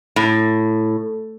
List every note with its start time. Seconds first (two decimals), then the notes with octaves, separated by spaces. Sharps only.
0.16 A2